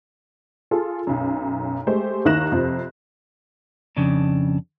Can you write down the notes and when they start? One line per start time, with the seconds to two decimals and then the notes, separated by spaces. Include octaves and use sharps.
0.71 F4 G#4 A4
1.07 B1 F#2
1.87 G#3 A3 G4 C5
2.25 D#2 D#3 E4 F#6 A#6 E7
2.52 F2 C3 F3
3.97 F2 C#3 D4